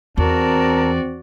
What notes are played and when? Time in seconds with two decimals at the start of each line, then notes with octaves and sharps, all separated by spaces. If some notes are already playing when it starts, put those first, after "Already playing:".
0.18 E2 C4 F#4 A#4 D5 A5 A#5